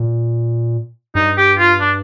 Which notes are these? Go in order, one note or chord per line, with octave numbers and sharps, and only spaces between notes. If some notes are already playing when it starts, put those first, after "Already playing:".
Already playing: A#2
G2 D#4
G4
F4
D4